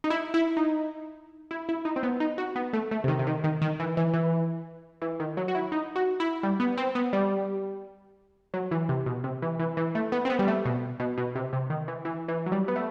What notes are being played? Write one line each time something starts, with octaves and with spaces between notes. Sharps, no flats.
D#4
E4
E4
D#4
E4
E4
D#4
C4
B3
D#4
F#4
B3
A3
A3
C3
D#3
C3
D#3
D#3
D#3
E3
E3
E3
E3
D#3
F#3
F#4
E4
D#4
F#4
E4
G3
B3
C4
B3
G3
F#3
E3
C3
B2
C3
E3
E3
E3
A3
B3
C4
B3
G3
A3
B2
B2
B2
C3
C3
D#3
E3
E3
E3
F#3
G3
B3
A3